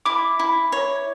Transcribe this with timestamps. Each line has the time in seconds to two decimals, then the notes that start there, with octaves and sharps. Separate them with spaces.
0.06 E4 D6
0.39 E4
0.72 C#5